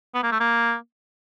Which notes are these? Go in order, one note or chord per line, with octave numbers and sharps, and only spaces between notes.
B3
A#3
A3
A#3